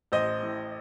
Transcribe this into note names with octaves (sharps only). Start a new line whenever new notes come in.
A1 C5 D#5
A2